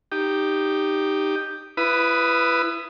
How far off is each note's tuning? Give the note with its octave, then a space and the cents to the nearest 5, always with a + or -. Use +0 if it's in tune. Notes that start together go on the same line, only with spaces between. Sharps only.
D#4 -10 G4 +0
E4 +30 B4 +5 D#6 +0